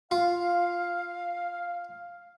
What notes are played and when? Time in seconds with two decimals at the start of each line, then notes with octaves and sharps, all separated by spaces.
0.11 F4 F5